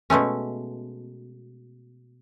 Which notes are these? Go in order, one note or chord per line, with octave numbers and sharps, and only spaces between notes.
B2 G#3 A3 C#4